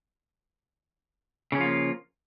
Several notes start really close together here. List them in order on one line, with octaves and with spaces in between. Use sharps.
C#3 C#4 F3 F4 A#3